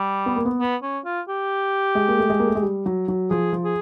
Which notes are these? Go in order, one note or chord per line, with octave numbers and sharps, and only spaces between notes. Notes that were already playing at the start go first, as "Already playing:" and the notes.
Already playing: G3
B3
A#3
B3
B3
C#4
F4
G4
G#3
A#3
A3
G#3
A#3
A3
G#3
G3
F#3
F#3
F3 G#4
F3
G#4